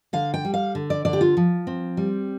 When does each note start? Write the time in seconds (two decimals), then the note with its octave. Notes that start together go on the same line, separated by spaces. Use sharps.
0.13 D3 F5
0.34 G5
0.45 G3
0.54 F5
0.75 D3
0.90 D5
1.05 D3 D5
1.13 G4
1.21 F4
1.37 F3
1.67 C4
1.97 G3